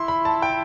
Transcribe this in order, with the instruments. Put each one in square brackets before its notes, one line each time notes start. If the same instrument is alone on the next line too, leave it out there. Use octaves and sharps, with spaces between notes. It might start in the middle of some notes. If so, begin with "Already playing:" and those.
Already playing: [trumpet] E4 [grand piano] C6
[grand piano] B5
A5
G5